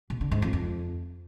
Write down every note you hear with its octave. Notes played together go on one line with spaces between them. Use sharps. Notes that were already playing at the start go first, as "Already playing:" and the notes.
B2
D3
G#2
F2
F2